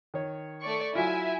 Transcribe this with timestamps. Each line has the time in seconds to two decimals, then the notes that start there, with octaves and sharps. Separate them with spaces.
0.14 D#3 C#5
0.62 A3 D5 C#6
0.95 F#3 E4 F4 E5 G#5